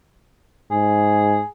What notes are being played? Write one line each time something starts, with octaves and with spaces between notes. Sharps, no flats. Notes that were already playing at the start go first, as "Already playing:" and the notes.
G#2 G#4